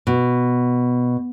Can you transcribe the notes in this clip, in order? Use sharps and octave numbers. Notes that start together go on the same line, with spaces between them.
B2